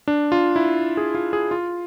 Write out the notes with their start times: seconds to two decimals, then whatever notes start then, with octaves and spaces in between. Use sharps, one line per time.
0.08 D4
0.32 F4
0.56 E4
0.97 G#4
1.15 F4
1.33 G#4
1.51 F4